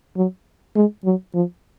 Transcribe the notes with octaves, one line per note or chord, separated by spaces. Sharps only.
F#3
G#3
F#3
F3